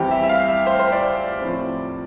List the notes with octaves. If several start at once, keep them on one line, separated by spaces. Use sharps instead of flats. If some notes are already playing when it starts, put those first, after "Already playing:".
Already playing: E2 E3 G3 C4 E4 G4
E5
E5
F5
E5
C5
C5
D5
A2 F3 C4